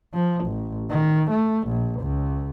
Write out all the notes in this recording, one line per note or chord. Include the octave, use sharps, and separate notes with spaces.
F3
A1
D#3
A3
A#1
C#2